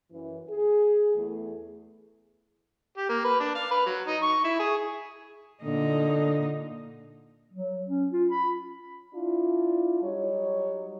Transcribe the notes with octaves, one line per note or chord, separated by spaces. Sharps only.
F#2 E3
G#4
E2 A3
G4
A#3
B4
D4
F5
B4
F#3
D#4
C#6
E4
G#4
A#2 D3 D#4
F#3
C#4
F4
B5
D4 E4 F4
F#3 G3 D#4 C#5